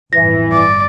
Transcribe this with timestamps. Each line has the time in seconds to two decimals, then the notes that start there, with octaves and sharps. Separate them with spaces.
0.13 G1 F2 A2 E3 A#6
0.52 D5